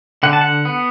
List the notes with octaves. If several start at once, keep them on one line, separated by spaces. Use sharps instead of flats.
D3 F#5
A5
F#5
B3